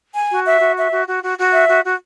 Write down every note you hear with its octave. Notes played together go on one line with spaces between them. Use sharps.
G#5
F#4
E5
F#4
E5
F#4
F#4
F#4
F#4
E5
F#4
F#4